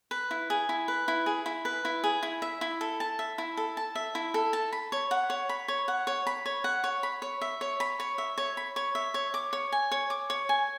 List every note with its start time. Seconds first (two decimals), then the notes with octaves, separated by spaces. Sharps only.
0.11 B4
0.31 E4
0.50 G#4
0.69 E4
0.88 B4
1.08 E4
1.26 G#4
1.46 E4
1.65 B4
1.85 E4
2.04 G#4
2.23 E4
2.42 E5
2.61 E4
2.81 A4
3.00 A5
3.19 E5
3.38 E4
3.57 A4
3.77 A5
3.95 E5
4.15 E4
4.34 A4
4.53 A5
4.72 B5
4.92 C#5
5.11 F#5
5.30 C#5
5.49 B5
5.68 C#5
5.88 F#5
6.07 C#5
6.27 B5
6.46 C#5
6.64 F#5
6.84 C#5
7.03 B5
7.22 C#5
7.41 E5
7.61 C#5
7.80 B5
8.00 C#5
8.18 E5
8.38 C#5
8.57 B5
8.76 C#5
8.95 E5
9.14 C#5
9.34 D6
9.53 C#5
9.72 G#5
9.91 C#5
10.10 D6
10.30 C#5
10.49 G#5